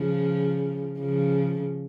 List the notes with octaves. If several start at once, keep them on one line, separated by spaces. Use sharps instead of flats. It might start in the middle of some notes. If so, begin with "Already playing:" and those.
Already playing: C#3 F3
C#3 F3